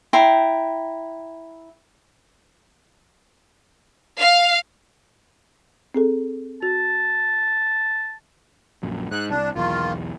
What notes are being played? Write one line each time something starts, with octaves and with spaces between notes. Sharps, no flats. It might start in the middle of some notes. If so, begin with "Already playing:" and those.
E4 G5 A#5 C6
F5
C4 G#4 A4
F#4 A5
A#1 F#2
G#2 F#6
C2 D4
B1 E2 D#3 A#3 F4